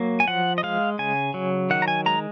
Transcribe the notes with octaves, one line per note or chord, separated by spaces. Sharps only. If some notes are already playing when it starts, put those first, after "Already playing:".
Already playing: F#3 A#3
G#5
F3 F#5
D#5
G#3 F5
C#3 G#5
F#3
D#3 F#5
A#5
G#5
G#3 A#5